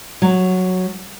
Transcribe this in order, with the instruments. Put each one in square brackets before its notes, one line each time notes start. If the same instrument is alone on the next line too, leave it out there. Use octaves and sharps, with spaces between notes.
[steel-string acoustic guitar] F#3